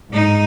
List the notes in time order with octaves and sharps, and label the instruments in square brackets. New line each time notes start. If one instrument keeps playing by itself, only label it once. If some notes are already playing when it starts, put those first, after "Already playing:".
[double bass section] G#2 [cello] D#4